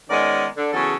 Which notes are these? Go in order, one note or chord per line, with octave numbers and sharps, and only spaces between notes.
D#3 G#3 B3 C#4 A#4 D5
D3
E2 C#3 F#3 G#4 A4